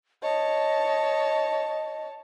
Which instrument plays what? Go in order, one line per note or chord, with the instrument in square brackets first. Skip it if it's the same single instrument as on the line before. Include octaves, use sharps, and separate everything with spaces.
[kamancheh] C#5 A5 [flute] D#5